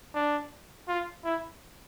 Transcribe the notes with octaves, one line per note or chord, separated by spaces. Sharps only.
D4
F4
E4